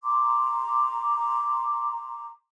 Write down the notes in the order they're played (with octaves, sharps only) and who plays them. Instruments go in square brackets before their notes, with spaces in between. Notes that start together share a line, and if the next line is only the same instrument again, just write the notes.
[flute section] A#5 C6 D6